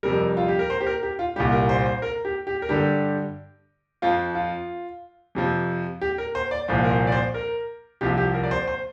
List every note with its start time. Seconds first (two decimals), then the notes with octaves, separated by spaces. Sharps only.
0.03 F2 C3 G3 A#4
0.37 F4
0.48 G4
0.59 A#4
0.70 C5
0.81 G4
0.87 A#4
1.03 G4
1.19 F4
1.36 C2 A#2 G3 G4
1.52 A#4
1.69 C5
1.86 C5
2.02 A#4
2.25 G4
2.47 G4
2.62 A#4
2.69 G2 D3 G3 G4
4.02 F2 F3 F4
4.35 F4
5.35 F2 C3 F3
6.01 G4
6.18 A#4
6.35 C5
6.51 D5
6.68 C2 A#2 F3 C5
6.84 A#4
6.91 C5
7.07 D5
7.12 C5
7.34 A#4
8.01 C2 C3 F3 G4
8.17 G4
8.34 A#4
8.44 D5
8.51 C5
8.67 C5